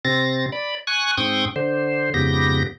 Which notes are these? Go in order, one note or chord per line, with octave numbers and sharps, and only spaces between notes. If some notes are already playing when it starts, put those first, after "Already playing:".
C3 C4 A6 A#6
D5 B5
G#5 C#6 F#6
G#2 C4 G5 C#6 D#6
D3 C5
F2 G#2 C#3 B3 G4 A#6